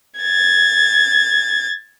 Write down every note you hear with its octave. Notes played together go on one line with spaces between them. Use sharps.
G#6 A6